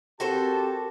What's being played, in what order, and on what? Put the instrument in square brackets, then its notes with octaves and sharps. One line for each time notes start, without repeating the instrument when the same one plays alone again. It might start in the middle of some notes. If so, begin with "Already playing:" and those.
[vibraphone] C4 A#4 [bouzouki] F#4 A4 C5 [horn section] G4 A5